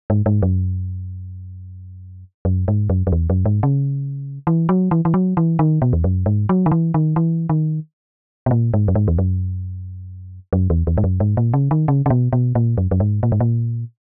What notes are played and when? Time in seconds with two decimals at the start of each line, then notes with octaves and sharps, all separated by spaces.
0.10 G#2
0.26 G#2
0.42 F#2
2.45 F#2
2.68 G#2
2.90 F#2
3.07 F#2
3.12 E2
3.30 F#2
3.46 G#2
3.63 C#3
4.47 E3
4.69 F#3
4.91 E3
5.05 E3
5.14 F#3
5.37 E3
5.59 D#3
5.82 B2
5.93 E2
6.04 F#2
6.26 G#2
6.49 F#3
6.66 D#3
6.72 E3
6.94 D#3
7.16 E3
7.49 D#3
8.46 B2
8.51 A#2
8.74 G#2
8.88 F#2
8.95 G#2
9.08 E2
9.18 F#2
10.53 F#2
10.70 E2
10.87 E2
10.98 G#2
11.04 F#2
11.20 G#2
11.37 A#2
11.54 C#3
11.71 D#3
11.88 C#3
12.06 C#3
12.10 B2
12.33 B2
12.55 A#2
12.78 F#2
12.91 F#2
13.00 G#2
13.23 A#2
13.32 G#2
13.40 A#2